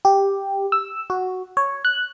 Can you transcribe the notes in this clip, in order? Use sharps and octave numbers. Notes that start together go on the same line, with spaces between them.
G4
E6
F#4
C#5
F#6